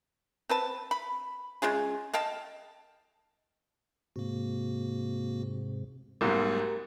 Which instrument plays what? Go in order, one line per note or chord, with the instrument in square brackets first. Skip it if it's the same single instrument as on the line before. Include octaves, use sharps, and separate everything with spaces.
[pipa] C4 B4 A5
B5
C#3 G#3 F4 G#4
D#5 F5 G5 A5
[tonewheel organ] G#2 C3 [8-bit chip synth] A#3 F#4
[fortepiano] B1 G#2 [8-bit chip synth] G3 A3 B3 [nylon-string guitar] G4 A#4